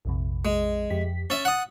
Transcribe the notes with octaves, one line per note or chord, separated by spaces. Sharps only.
A#1 F2 C3
G#3
F2 G4 B6
C#4 E5 A6
F#5 D#6